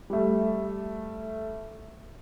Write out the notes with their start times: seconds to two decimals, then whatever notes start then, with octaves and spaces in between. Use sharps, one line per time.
0.10 G3 A3